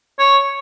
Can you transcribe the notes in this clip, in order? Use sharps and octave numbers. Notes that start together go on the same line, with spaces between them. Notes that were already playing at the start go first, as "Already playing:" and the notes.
C#5